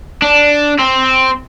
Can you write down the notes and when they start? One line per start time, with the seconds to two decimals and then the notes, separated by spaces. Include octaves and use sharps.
0.22 D4
0.79 C4